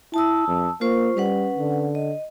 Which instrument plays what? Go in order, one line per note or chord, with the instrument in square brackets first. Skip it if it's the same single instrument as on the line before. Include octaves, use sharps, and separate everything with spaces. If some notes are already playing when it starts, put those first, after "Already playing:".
[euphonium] E4 [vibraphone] A5 D#6 E6
[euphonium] F2
[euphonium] A#3 [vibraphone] F4 C5 C#6
[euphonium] G3 [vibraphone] C#4 B4 F#5
[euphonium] D3
[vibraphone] D#5